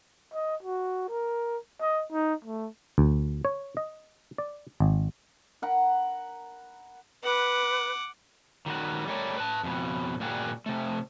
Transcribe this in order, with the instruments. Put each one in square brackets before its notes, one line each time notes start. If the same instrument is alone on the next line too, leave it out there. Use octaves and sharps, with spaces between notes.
[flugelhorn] D#5
F#4
A#4
D#5
D#4
A3
[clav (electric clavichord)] D2
C#5
D#5
D5
G#1
[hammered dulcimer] A#4 F#5 B5
[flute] B4 [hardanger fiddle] F#5 D6
[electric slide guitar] D#3 G3 F#4
G3 A3 A#4 C#5 D5
B4 A5
F2 B2
G2 A#2 G3 F#4 G#4 A#4
C3 A3